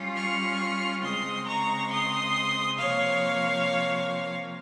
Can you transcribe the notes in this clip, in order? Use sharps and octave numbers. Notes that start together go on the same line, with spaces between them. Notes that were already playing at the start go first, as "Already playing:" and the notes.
Already playing: G3 C#4 F4
C#6 F6
C#3 G#3 C4 C6 D#6
A#5 C#6
C6 D#6
C3 F3 A#3 C#5 F5